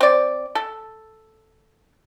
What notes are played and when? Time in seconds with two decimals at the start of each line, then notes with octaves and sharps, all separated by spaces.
0.01 C4 D5
0.55 A4